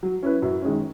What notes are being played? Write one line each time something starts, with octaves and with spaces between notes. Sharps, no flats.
F#3
C#4 E4 B4
F#2
D#3 G#3 C#4